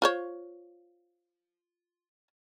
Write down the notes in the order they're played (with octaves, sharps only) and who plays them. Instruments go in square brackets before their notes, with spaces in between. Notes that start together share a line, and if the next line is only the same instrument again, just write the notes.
[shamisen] F4 C5 C#5